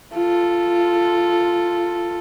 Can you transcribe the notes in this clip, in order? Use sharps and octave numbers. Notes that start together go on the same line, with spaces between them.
F4 A4